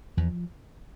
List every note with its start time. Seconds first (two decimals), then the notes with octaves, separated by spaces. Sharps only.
0.17 E2 F3